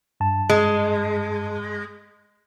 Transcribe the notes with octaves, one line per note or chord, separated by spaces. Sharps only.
G2 A5
G#3